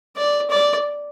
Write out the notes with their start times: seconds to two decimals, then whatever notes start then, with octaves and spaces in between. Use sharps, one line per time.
0.17 D5
0.50 D5